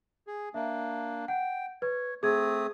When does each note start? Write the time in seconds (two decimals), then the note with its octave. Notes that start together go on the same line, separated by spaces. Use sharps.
0.27 G#4
0.54 A#3 D4 E5
1.28 F#5 G5
1.82 B4 C#5
2.23 A3 C4 G#4 D#6 G#6